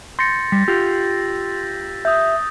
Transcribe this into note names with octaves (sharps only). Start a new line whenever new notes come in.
C6 G6 A6 A#6 C#7
G3 B6
F4 G4 E6
E5 D#6 G6